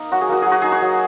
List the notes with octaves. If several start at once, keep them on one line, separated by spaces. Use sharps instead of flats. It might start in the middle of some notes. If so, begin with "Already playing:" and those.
Already playing: A#3 D#4
F#3 F#4
G#4
A#3 F#4
F#3 G#4
F#4
D#4 G#4
F#4
F#3